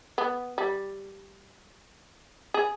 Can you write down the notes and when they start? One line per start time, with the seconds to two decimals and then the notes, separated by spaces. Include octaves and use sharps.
0.18 B3
0.58 G3
2.54 G#4